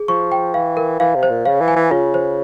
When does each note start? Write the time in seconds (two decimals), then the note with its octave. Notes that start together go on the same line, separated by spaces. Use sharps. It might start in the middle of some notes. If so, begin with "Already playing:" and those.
Already playing: G#4
0.08 F3 C#6
0.32 G5
0.54 E3 F5
0.77 A#4
1.00 E3 F5
1.15 C3
1.23 C5
1.30 A#2
1.45 C#3 F5
1.61 E3
1.68 G#5
1.76 E3
1.91 C#3 F4
2.14 C5